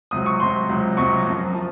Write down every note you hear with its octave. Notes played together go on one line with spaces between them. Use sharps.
C#2 C3 F#3 D#6
C#6
C#2 C3 F#3 C6
C#2 C3 F#3
C#2 C3 F#3 C#6
F#2 F3
F3